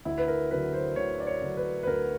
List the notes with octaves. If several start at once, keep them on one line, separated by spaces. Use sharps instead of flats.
D2 E4
B4
A#4
D3 F#3 B4
C5
D2 C#5
D5
C#5
D3 F#3
B4
B4
D2 A#4